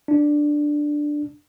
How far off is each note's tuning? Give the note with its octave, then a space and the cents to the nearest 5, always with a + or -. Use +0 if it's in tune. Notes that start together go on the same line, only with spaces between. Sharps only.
D4 +5